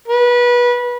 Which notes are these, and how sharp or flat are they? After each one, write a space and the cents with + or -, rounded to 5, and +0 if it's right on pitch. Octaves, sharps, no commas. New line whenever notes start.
B4 -25